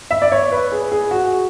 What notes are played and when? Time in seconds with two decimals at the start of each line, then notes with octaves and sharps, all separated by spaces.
0.11 E5
0.22 D5
0.32 C#5
0.52 B4
0.72 G#4
0.92 G#4
1.11 F#4